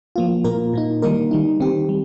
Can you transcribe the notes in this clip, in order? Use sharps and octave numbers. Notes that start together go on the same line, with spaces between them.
F3 A#3 F4
A#2 A#3 F4 A#4
A#2 A#3 D#4
D#3 G3 A#3 D#4 A#4
D#3 G3 D#4
D#3 C4 G4
G3